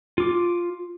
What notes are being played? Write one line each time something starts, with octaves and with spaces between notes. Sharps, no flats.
F4 D6